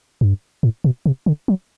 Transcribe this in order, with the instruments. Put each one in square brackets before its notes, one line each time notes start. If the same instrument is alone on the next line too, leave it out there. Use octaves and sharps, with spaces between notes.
[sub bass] G2
A2
B2
C3
D3
F#3